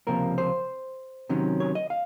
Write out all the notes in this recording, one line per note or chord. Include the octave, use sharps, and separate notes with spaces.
C#2 C3 F3 A#3 A#4
C5
C3 D#3 F#3 C#4
C#5
D#5
F5